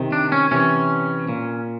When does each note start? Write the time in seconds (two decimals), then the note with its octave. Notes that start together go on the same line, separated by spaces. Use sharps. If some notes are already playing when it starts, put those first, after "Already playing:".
Already playing: C3 D#3
0.12 D4
0.32 C#4
0.51 C3 E3 C#4
1.29 A#2